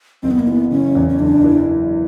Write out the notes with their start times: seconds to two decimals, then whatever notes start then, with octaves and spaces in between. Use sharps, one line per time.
0.23 F#1 C4
0.31 B3
0.39 A#3
0.47 E3 B3
0.71 C#3 C#4
0.95 E2
1.09 C#4
1.19 F#1 D4
1.44 E3